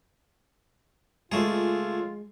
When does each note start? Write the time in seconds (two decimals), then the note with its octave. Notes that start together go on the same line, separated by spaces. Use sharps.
1.32 C#2 G#3 A3 F4 G#4